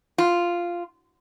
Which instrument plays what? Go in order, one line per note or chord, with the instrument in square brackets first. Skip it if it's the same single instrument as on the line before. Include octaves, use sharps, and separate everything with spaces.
[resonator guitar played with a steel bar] F4